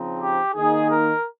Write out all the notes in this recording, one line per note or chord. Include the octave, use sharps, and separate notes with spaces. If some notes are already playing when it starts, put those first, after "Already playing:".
Already playing: C#3 F3 C4 D#4
G4
D#3 A#3 D#4 G#4
A#4